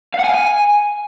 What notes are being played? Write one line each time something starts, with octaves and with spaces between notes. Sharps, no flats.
F5
F#5
G#5
F5
G#5